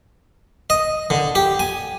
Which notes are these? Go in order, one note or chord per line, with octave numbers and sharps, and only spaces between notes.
D#5
D3
G4
G#5